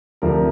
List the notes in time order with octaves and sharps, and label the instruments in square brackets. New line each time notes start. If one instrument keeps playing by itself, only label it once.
[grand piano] D2 C3 F3 A#4